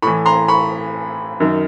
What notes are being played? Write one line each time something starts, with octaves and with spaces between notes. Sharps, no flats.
A2 E3 B5 C#6
A#5 C6
B5 C#6
F#2 D#3